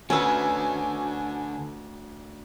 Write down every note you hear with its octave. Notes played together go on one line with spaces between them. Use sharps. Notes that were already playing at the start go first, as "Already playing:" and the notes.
D2 D3 C#4 F#4 B4 G#5 E6